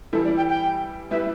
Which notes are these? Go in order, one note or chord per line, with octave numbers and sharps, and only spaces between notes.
E3 G3 E4 A4
D5
G5
G5
G3 B3 E4 B4 E5